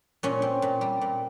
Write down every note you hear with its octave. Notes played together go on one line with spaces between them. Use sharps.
A#2 C#4
C4
A#2
G3
A#2